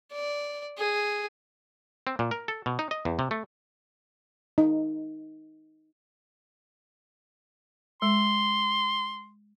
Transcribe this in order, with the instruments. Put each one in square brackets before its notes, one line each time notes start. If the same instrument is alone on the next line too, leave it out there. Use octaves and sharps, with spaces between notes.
[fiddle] D5
G#4
[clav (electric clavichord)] C4
A#2
A#4
A4
B2
D#4
D#5
E2
C3
A3
[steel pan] D#4
[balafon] G#3 [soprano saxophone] C6